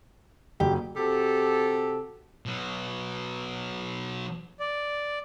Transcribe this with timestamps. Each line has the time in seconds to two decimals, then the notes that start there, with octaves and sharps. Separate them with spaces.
0.60 F#1 G4
0.96 C3 F#4 G4 A4
2.46 B2 F#3
4.60 D5